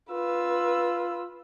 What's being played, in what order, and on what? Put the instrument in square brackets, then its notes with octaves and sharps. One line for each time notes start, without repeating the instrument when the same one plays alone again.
[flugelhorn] F4 [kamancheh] B4 E6